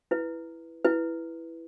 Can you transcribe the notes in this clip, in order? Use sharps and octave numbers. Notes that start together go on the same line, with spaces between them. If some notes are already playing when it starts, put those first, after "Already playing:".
E4 B4
E4 B4